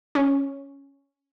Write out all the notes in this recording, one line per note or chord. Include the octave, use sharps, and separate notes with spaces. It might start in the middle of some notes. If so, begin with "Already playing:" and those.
C#4